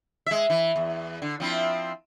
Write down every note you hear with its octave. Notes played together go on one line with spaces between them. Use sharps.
G#3 E5
E3
E2
D3
F3 C4 E4